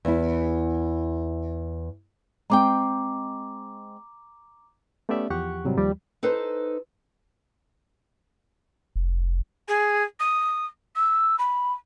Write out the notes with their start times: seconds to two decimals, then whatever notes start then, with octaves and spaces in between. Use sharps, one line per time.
0.05 E2 E4
2.50 G#3 C4 G5 A#5 D6
5.09 A3 B3 C#4 G4 D5 E5
5.30 E2 F3 G4 F#5 C#6 F#6
5.65 G#2 C3 F#3 G3
5.77 D#2 F3 G3
6.23 D#4 A4 B4 C5
8.96 F1
9.68 G#4
10.20 D#6
10.95 E6
11.38 B5